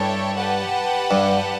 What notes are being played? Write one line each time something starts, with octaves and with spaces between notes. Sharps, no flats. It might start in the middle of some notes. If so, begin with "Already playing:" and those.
Already playing: G2 E4 A4 C#5 G5
G4 B4 F#5 A5
G2